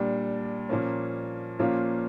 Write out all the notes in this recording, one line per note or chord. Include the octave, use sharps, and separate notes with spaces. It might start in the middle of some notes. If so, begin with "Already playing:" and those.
Already playing: A#2 G3 D4
A#2 F3 A#3 C#4
A#2 F3 A#3 C#4 F4